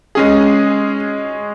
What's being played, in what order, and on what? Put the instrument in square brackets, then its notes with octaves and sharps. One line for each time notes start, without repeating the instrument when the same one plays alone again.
[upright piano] G#3 C#4 G#4